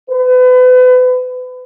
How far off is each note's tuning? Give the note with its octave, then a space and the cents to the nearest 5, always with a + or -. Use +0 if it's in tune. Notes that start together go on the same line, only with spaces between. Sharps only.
B4 +35